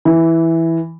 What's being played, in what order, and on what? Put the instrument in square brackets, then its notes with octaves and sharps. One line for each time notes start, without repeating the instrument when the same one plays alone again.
[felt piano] E3